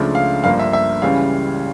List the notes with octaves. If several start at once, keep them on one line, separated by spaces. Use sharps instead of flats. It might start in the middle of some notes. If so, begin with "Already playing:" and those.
Already playing: C#2 C#3 F3 A3 D4
F5
G1 G2 F3 A#3 F5
E5
E5
C#2 C#3 E3 G3 C#4 F5